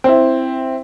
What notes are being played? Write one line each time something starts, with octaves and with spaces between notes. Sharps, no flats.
C4 E4